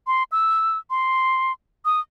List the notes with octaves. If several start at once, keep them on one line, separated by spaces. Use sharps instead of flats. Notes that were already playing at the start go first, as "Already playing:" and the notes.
C6
E6
C6
D#6